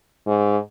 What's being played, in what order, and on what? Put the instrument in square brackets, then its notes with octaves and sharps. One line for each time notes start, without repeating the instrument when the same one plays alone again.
[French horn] G#2